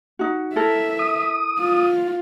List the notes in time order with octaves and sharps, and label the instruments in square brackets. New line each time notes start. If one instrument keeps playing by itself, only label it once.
[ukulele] D#4 F#4
[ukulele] E4 A4 A#4 [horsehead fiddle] E5
[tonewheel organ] D#6
[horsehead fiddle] F4